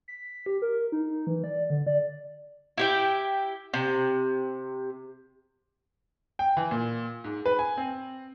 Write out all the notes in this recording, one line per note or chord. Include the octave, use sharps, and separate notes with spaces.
B6
G4
A#4
D#4
E3
D5
D3
D5
E4 G4 G5
C3
G5
E3
A#2
G#2
B4
G#5
C4